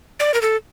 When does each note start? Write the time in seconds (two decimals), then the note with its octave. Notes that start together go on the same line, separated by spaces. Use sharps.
0.20 D5
0.34 A#4
0.41 A4